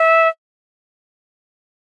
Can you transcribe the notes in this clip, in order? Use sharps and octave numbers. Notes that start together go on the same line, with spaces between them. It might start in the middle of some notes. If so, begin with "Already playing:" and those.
Already playing: E5